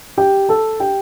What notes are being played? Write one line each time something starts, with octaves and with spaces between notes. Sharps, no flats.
G4 G5
A4 A5
G4 G5